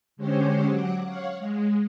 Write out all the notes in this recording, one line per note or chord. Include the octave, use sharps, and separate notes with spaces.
D3 G#3 C#4 G4 C5 C#5
F#3 F#5 D6
C#5 F5 F#5
G#3